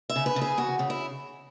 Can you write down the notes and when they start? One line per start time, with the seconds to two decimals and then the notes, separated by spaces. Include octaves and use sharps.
0.10 E5
0.16 C#3
0.26 B4
0.36 C#3
0.42 G#4
0.58 E2 F#4
0.79 C#3
0.90 E4